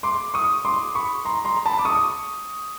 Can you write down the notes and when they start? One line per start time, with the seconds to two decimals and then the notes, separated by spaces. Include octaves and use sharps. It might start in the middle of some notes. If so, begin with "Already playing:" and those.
0.03 C6 D6
0.34 C#6 D#6
0.65 C6 D6
0.95 B5 C#6
1.25 A#5 C6
1.45 A#5 C6
1.66 A5 B5
1.79 D6
1.85 C#6 D#6